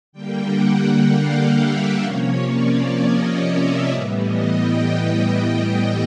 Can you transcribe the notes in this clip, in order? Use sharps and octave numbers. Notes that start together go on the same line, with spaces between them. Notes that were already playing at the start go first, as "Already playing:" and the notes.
D3 G3 A#3 G5
F#5
G5
F5
E5
C3 F3 A#3 C#4 C#5
D5
D#5
E5
A2 E3 G3 B3
D#5
G5